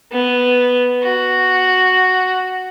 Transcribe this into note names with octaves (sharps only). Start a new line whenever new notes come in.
B3
F#4